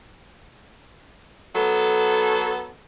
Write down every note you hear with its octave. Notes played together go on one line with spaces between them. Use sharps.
F#3 B3 A4